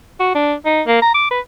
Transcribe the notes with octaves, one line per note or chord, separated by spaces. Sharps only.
F#4
D4
D#4
A#3
A#5
D6
B4